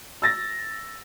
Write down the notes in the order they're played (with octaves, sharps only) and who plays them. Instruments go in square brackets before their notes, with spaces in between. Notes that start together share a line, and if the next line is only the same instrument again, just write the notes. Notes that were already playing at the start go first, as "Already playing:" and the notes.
[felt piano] E6 A6 A#6